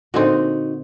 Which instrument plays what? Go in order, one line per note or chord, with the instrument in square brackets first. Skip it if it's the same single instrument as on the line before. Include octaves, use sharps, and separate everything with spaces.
[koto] A#2 D3 C4 [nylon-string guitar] D#4 F#4